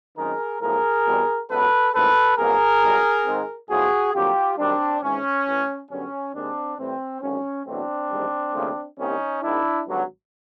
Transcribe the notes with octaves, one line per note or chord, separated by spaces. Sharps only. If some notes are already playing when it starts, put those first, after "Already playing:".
F#2 D#3 G#3 C4 G#4 A#4
B1 A2 F3 G#4 A#4
E2 B2 G3 C4
C#2 B2 F#3 B3 A4 B4
A1 G#2 F3 A#3 A4 B4
C2 B2 F#3 A#3 G#4 A#4
B1 B2 G3
G#2 D#3 G#3 C4
B1 A2 F3 F#4 G#4
F2 D3 F#3 A#3 F4 G4
F#2 D#3 G3 C4 D4
G#1 G#2 E3 G#3 C#4
A1 A2 E3
F#2 D3 G3 B3 C#4
D#2 D#3 G#3 C4 D4
A2 E3 G3 C4
G#1 F#2 D3 C#4
E2 B2 F#3 A3 C4 D4
A1 G#2 D#3 G3
D#2 C#3 F3 A3
C2 C3 D#3 G3 A#3 C#4 D#4
G#1 G#2 D#3 D4 E4
G#1 G2 D3 F#3